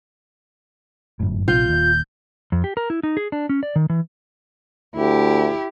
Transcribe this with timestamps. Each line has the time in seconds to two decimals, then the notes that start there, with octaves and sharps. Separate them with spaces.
1.20 G1 F#2 A2
1.48 A#1 C3 F4 G6
1.69 D#1 D#2
2.52 F2
2.64 G4
2.77 A#4
2.90 E4
3.03 D#4
3.17 G#4
3.32 D4
3.49 C#4
3.63 D5
3.76 D#3
3.90 E3
4.96 D2 E4 G4